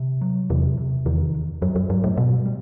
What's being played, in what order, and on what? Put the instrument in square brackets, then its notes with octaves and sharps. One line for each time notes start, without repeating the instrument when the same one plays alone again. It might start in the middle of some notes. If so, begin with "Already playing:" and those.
Already playing: [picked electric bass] C3
F#3
[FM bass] E2 [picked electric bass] C3
[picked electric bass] C3
[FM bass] E2 [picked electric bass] D#3
[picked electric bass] E2
[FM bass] F#2 [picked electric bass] F#3
[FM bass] F#2
[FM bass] G2 [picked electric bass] F#3
[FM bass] A2
[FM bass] B2 [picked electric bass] G3
[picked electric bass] G3